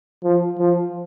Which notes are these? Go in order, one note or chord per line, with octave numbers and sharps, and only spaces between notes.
F3
F3